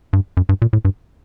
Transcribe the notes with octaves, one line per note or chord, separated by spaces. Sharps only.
G2
F#2
G2
A#2
A2
G2